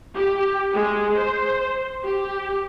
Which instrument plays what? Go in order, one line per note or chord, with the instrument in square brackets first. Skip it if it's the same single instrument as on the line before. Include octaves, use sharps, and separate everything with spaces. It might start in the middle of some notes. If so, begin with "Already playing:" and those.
[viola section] G4
G#3
C5
G4